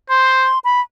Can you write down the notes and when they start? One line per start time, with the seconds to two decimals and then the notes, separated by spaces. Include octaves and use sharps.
0.10 C5 C6
0.64 B5